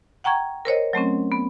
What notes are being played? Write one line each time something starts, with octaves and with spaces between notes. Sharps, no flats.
F#5 G5 A#5 C#6 G#6
A#4 C5 C#5 D#5
F#3 A3 C4 C#4
B3